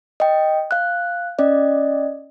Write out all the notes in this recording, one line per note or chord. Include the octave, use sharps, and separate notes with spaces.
D#5 G5
F5 F#6
C#4 D5 D#5